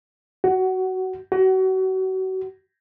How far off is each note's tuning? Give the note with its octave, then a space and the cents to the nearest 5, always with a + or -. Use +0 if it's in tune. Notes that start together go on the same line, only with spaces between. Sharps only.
F#4 +20
F#4 +35